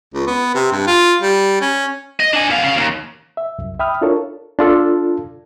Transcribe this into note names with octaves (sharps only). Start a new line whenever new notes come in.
C#2
B3
C3
G2
F4
G3
C#4
D#5
D4 G#5
B3 F5
C#4 F5
D#2
E5
C2 F#2
E5 G5 B5 D#6 F6
D4 E4 F4 A4 A#4 C#5
D4 F4 A4